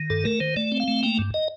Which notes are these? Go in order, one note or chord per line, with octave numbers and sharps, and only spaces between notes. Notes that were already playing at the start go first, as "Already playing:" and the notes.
Already playing: D#3
G2 A4
A3 A#4
D#3 C5
A3 D5
C4
F5
A3
A#3 G5
G2
D#5